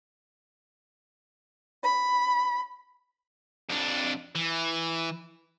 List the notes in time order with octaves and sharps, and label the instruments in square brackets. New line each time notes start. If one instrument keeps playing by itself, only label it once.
[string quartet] B5
[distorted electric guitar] F2 D4
E3